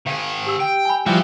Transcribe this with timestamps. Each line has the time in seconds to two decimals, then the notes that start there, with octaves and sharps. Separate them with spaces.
0.07 D#3 G#4 F5
0.46 G4 E6
0.60 G5
0.85 G#5 B5
1.06 E3 F3 G3 F#4